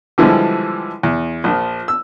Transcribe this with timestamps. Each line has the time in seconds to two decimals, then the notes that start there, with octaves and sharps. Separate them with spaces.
0.18 D3 E3 F3 G3 G#3
1.03 E2
1.44 A#1 F3
1.88 E6